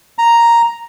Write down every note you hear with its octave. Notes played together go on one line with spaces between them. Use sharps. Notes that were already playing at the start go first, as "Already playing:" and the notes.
A#5